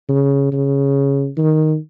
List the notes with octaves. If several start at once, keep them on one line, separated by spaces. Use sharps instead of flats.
C#3
C#3
D#3